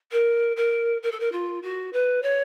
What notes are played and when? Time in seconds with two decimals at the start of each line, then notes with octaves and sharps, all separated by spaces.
0.11 A#4
0.56 A#4
1.02 A#4
1.11 A4
1.20 A#4
1.32 F4
1.62 F#4
1.93 B4
2.22 C#5